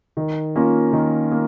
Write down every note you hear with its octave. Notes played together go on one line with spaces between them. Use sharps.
D#3
A#3 C#4 F4 A#4
D#3
A#3